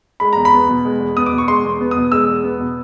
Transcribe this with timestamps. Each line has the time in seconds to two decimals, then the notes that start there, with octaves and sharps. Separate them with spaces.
0.20 G#3 B5
0.33 E2 A#5
0.45 B5
0.53 B3
0.69 B2
0.85 G#3
1.00 E2
1.17 B3 D#6
1.26 D6
1.32 B2
1.38 C#6
1.48 G#3 C6
1.65 E2
1.81 B3
1.91 D#6
1.96 B2
2.12 G#3 E6
2.28 E2
2.44 B3
2.60 B2